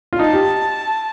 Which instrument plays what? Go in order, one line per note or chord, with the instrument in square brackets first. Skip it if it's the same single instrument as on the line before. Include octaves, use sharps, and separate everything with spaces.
[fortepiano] F4
[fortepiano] D#4 [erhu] A5
[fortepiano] G4